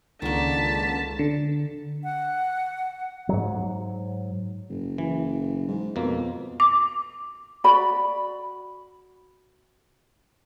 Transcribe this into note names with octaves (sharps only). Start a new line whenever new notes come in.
C#2 D3 D#3 A#3 A5 B6
D3
F#5
G#2 F#3
F#1
E3
G#2
F2 B2 A#3
D6
F#4 D5 B5